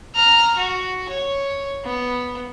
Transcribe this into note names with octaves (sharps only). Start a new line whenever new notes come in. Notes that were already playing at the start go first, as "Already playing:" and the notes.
A#5 F6
F#4
C#5
B3